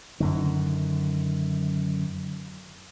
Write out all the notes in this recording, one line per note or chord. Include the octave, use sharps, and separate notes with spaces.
F#2 D3 D#3